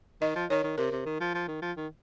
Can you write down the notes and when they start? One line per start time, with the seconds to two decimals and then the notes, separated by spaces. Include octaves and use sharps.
0.21 D#3 D#5
0.36 F3
0.50 D#3 C#5
0.64 D#3
0.78 C3 A#4
0.91 C3
1.05 D#3
1.20 F3
1.34 F3
1.48 D#3
1.62 F3
1.77 D#3